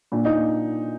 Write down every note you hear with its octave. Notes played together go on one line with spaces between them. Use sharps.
A#2 D4
D#4
A#2